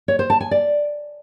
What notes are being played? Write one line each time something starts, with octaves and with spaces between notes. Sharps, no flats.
C#5
C5
A5
G#5
D5